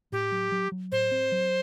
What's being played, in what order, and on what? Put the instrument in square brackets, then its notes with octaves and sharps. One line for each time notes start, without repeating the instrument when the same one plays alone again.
[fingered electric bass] A2 [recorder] G4
[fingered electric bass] F#3
F#3
F#3
[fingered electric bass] A2 [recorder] C5
[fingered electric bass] C4
F#3